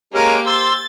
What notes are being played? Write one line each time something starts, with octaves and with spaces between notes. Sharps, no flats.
G#3 A#3 C#4 G4 A#4 D7
C5 C6 E6 A6